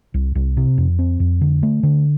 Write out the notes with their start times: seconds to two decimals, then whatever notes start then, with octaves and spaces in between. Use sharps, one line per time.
0.14 C2
0.35 C2
0.57 C3
0.78 F2
0.99 C4
1.20 F2
1.41 D3
1.63 A3
1.83 D3